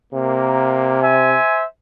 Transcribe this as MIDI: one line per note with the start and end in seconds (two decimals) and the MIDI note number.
0.13 1.36 48
0.13 0.97 58
1.02 1.64 72
1.02 1.64 76
1.02 1.64 80